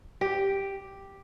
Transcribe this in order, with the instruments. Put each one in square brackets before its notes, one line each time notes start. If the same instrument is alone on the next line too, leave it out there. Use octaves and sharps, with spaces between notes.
[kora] G4